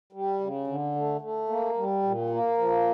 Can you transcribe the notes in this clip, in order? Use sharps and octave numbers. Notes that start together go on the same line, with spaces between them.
G3
C#3
D3
A3
A3
A#3
G3
A#2
A#3
F3